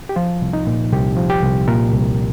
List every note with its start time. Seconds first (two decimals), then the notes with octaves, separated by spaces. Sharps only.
0.09 G4
0.16 F3 F4
0.42 C2
0.53 D#4
0.67 A#2
0.92 C2 G4
1.17 F3
1.30 G4
1.43 C2
1.68 A#2 A#4
1.94 C2